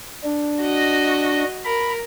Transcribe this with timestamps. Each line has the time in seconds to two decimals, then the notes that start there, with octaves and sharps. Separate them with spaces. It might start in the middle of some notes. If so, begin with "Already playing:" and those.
0.24 D4
0.63 F#4 D#5
1.65 A#4 B5